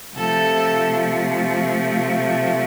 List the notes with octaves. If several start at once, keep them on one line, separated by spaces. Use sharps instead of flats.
C3 F3 A3 A4